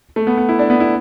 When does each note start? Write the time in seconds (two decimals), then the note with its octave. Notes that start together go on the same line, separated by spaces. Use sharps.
0.16 A3
0.27 B3
0.37 B3
0.49 E4
0.59 D4
0.70 B3
0.80 E4